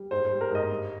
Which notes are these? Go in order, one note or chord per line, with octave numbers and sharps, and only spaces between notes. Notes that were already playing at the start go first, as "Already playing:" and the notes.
Already playing: G3
G#2 C5
G3 C5
A#4
G#2 D#5
G2